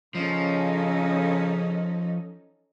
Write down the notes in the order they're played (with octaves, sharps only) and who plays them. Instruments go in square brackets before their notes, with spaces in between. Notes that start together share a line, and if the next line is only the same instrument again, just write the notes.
[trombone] C#3 [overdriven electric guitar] F3 [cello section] C#4 D#4 A4